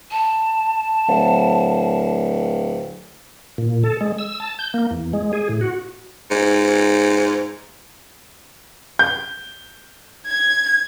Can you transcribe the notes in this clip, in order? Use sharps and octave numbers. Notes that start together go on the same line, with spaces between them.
A5
D1
A#2
A4
G#3
E6
A5
G6
A#3
E2
G#3
G#4
A2
F#4
G#2
G6
G#6